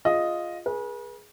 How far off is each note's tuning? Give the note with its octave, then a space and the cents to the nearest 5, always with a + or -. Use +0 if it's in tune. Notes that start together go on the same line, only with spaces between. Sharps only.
F4 +0 G#4 +0 D#5 +0
G#4 +0 B4 -40